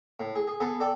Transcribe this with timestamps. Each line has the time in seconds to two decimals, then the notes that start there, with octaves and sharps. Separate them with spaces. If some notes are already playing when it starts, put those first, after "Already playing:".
0.20 A2
0.35 G#4
0.47 G#4
0.60 B3 G#4 A4
0.80 A4 D5 G5